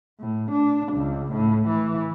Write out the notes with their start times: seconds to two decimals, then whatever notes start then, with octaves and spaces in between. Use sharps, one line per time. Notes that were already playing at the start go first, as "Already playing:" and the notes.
0.19 A2
0.51 D4
0.93 C#2
1.32 A2
1.69 E3